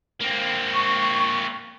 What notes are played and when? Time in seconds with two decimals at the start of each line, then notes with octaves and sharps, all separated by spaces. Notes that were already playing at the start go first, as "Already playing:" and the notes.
0.21 A#3 C4
0.73 C#6